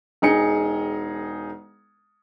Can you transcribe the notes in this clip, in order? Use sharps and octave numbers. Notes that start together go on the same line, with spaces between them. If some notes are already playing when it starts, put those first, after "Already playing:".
E1 D#4 G#4 C#7